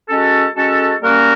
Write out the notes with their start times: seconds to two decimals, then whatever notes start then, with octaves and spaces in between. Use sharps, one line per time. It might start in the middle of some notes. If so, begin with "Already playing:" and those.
0.08 G#3 C#4 F#4 A4
0.55 G#3 C#4 F#4 A4
1.01 G3 A#3 C#4 F#4 A#4